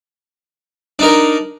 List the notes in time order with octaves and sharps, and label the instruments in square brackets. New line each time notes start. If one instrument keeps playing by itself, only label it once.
[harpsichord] D4 D#4 A#4